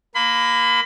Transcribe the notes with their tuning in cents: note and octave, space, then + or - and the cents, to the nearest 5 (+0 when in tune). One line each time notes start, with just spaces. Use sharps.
A#3 +10 B5 +30